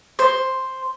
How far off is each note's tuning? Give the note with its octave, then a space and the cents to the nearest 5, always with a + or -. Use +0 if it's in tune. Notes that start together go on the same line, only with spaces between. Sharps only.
C5 +0